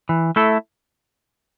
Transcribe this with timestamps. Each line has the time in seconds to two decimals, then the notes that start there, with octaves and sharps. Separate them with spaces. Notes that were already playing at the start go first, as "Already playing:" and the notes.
0.09 E3
0.36 A3 E4 A4